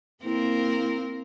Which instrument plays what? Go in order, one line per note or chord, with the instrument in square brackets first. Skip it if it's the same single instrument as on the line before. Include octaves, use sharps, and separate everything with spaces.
[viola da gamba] A#3 C4 A#4 [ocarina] E4